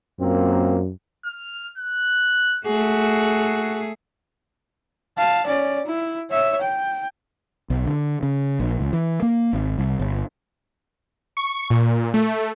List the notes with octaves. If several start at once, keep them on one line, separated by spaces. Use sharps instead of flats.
F#2 A#2 A#3 C4
F6
F#6
A3 F#4 G#4
F5 A5
C#4 D5
E4
C#5 E5
G5
B1
D3
C#3
A#1
C#2
E3
A#3
G#1
C2
G1
C#6
A#2
A3